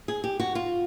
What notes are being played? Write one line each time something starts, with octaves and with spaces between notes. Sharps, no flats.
G#4
G4
F#4
F4